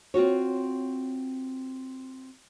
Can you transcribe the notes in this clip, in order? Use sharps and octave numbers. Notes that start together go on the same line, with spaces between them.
C4 F4 F#4 C#5